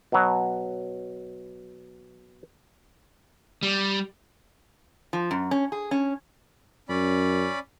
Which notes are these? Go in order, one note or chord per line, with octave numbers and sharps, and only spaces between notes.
B2 F#3
G3
F3
F#2
C#4
G#4
C#4
F#2 C#4 D5 B5